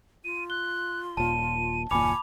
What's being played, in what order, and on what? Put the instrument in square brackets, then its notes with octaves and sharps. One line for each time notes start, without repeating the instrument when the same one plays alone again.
[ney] F4 [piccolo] D#7
[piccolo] F#6 [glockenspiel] G7
[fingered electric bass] D#1 A#2 [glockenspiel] A5 [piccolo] D#7
[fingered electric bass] F#1 D#2 A#2 [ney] G#5 [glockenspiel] B5 D6 F7 [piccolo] C#7